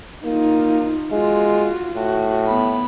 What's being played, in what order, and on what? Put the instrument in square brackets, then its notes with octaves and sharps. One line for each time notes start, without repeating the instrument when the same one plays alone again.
[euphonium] A#3 [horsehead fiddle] D#4 F4
[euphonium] G#3 [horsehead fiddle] F4 F#4
[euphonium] A2 [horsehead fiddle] F#4
[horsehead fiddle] B3 B5